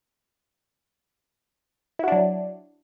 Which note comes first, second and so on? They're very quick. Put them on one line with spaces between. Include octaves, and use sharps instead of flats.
E4 F#4 D4 F#3